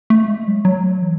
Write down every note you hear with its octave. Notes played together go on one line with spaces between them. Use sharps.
A3
G#3
F#3
F#3
E3